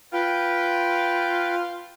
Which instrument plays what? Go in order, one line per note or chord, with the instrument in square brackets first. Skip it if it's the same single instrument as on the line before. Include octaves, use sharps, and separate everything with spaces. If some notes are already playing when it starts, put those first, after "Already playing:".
[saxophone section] F4 [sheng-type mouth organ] B4 G5